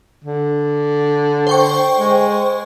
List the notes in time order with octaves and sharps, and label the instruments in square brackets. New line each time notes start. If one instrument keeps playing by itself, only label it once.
[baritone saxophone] D3
[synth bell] C5 G5 C#6
[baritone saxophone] G#3